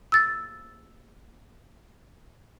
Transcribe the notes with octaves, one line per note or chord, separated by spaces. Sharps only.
E6 A6